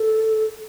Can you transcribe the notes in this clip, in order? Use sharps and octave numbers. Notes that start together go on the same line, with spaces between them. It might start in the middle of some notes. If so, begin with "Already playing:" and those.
Already playing: A4